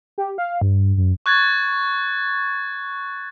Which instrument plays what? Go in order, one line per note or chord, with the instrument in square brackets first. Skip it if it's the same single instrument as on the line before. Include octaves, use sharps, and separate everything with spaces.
[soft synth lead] G4
F5
G2
F#2
[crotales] C#6 F#6 G#6 A6